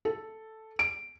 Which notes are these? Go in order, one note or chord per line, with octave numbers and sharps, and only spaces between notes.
A4
D7